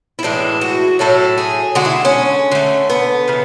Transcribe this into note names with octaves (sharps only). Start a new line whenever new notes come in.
E4
A2 E3 G#3 D4
F#4
A2 F#3 A3 A4
G#4
D3 G#3 F#4
E4
C#4
D3 A3
B3
C#3 E3